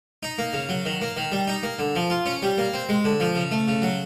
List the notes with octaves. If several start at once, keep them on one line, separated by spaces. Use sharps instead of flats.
D#4
A#3
C#3
F#3
D#3
A#3
D#3
G3
D#4
A#3
D3
F3
F4
C#4
G3
A#3
C4
G#3
D3
F3
C#3
A3
C#3
F#3